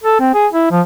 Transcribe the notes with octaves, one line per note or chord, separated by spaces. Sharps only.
A4
C4
G#4
E4
F3